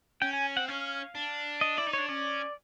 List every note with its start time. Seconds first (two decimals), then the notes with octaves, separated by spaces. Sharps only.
0.21 C#4 G5
0.33 G#5
0.57 C4 F#5
0.68 C#4 F5
1.15 D4
1.61 D#5
1.77 E4 D5
1.87 D#4
1.93 D4 C#5
2.09 C#4 D5